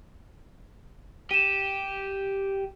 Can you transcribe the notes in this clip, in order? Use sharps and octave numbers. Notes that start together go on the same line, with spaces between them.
G4 D#7 E7